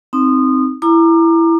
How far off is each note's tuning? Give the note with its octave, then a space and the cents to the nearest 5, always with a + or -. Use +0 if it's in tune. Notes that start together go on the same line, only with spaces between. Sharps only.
C4 +0 D#4 +0 D#6 -20
E4 +10 A#5 +0 D6 +30